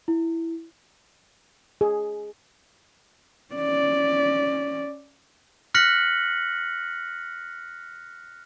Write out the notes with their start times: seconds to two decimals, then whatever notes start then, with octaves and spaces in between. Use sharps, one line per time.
0.08 E4
1.81 G#4
3.54 C#4 D5
5.74 F6 F#6 A#6 B6 C#7 F#7